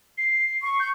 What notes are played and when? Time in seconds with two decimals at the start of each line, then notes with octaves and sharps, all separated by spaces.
0.18 C7
0.63 C#6
0.80 G6